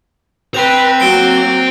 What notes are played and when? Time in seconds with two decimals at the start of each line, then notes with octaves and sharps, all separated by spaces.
0.54 B4 C5 G5 F7
1.00 F#3 A#3 C7 D7 G7